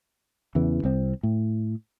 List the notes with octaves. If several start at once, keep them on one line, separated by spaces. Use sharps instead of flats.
E2 C#3 E3
C2 C4
A2